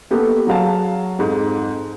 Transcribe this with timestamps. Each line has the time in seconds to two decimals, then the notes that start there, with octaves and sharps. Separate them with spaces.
0.11 A#3 B3 G4 A4
0.47 F#3 G#4 F5 A5
1.18 F2 G#2